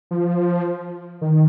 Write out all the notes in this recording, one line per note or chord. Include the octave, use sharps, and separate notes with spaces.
F3
D#3